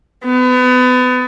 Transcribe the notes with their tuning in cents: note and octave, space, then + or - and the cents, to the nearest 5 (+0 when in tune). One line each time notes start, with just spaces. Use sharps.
B3 +30